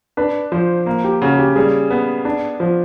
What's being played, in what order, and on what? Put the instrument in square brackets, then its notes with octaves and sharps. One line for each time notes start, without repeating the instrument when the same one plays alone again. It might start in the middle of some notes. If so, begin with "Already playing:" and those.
[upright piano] D4 [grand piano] B4
[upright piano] F3 [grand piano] C5
[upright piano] A#3
[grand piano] G4
[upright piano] C#3 [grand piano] F#4
[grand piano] G4
[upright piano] G3 [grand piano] G#4
[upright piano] B3
D4
F3